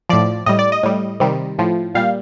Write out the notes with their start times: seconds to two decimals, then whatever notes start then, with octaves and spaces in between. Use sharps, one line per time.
0.09 A2 F3 D5
0.46 A2 G3 D#5
0.59 D5
0.72 D#5
0.83 A2 G3
1.20 C3 D#3 G3
1.58 A2 F3
1.95 A#2 G3 F5